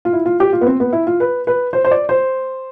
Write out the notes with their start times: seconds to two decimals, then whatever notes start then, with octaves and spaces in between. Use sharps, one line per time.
0.05 F4
0.13 E4
0.26 F4
0.40 G4
0.53 F4
0.61 B3
0.67 C4
0.80 B3
0.93 E4
1.07 F4
1.20 B4
1.47 B4
1.73 C5
1.85 C5
1.91 D5
2.09 C5